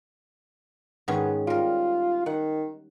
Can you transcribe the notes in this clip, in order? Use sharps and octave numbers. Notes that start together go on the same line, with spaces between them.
G#2 D#3 B3 C#4
G3 F4 A#4
D#3 F#5